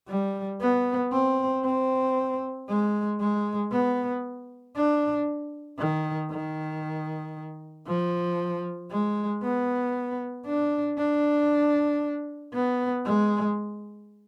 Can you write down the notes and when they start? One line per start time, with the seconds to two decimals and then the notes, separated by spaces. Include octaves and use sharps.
0.08 G3
0.60 B3
1.13 C4
1.64 C4
2.68 G#3
3.20 G#3
3.72 B3
4.76 D4
5.79 D#3
6.31 D#3
7.87 F3
8.90 G#3
9.43 B3
10.46 D4
10.98 D4
12.54 B3
13.05 G#3